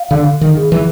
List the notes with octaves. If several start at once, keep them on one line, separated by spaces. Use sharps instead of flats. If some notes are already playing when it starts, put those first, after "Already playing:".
Already playing: F5
D3 F5
D#3
G#4
E3